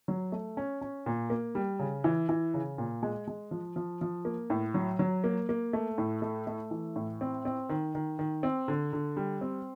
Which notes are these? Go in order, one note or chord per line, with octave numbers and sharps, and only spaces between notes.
F#3
A3
C#4
C#4
A#2
A#3
G3
C#3
E3
E3
C#3
A#2
G#3
G#3
F3
F3
F3
A#3
A2
F#3
F#3
A#3
A#3
A3
A2
A3
A3
E3
A2
C4
C4
D#3
D#3
D#3
C4
D3
D3
G3
C4